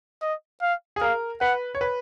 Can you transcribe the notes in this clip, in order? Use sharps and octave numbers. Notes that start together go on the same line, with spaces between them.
D#5
F5
G#4
A#4 F5
B4 F#5
C#5
B4